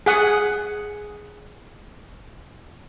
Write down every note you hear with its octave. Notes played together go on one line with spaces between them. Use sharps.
G#4 F#5 D#6